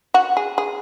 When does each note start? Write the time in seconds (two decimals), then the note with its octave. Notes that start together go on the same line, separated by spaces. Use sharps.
0.14 F#4
0.37 G#4
0.58 G#4